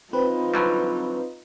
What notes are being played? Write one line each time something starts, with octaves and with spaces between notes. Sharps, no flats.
C4 D#4 F4 B4
D3 F#3 G3